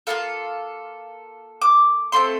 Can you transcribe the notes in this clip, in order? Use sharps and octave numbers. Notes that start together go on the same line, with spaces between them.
A#3 F4 A4 F5
D6
A3 C4 F4 A4 C6